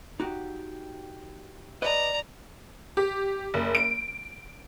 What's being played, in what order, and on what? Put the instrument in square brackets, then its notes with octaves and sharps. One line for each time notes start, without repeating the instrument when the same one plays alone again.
[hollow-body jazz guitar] D#4 F#4 G4
[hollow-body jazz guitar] B4 D#5 [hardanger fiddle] D5 A#5
[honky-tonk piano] G4
F#1
D7